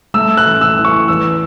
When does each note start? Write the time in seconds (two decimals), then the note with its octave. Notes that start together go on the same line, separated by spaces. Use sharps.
0.14 A3 E6
0.37 F#6
0.46 A1
0.61 E6
0.77 E3
0.85 C#6
1.08 E2 E6